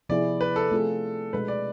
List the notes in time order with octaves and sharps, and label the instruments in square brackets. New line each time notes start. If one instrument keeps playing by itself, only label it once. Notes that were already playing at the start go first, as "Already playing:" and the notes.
[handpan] C3 F3 B3 E4 G#4 [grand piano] D5
[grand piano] B4
A4
[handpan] A3 C4 F4 G#4
[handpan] B2 G#3 D4 A4 [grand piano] B4
[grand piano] D5